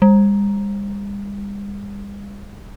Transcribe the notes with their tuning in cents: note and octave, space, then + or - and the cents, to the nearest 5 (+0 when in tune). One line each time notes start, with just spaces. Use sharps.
G3 +45